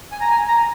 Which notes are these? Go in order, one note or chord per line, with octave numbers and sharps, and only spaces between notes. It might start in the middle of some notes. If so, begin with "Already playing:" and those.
G#5
A#5
G#5
A#5